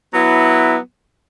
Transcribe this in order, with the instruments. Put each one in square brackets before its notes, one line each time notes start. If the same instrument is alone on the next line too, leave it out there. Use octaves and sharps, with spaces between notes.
[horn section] F#3 B3 E4